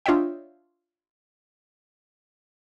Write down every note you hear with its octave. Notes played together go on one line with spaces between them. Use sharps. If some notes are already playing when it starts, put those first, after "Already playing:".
D4 F4 C#5 D#5 E5 G5